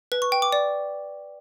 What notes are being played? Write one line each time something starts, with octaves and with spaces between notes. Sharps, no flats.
B4
C#6
G5
D6
D5